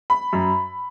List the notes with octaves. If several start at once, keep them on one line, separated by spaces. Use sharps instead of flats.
B5
F#2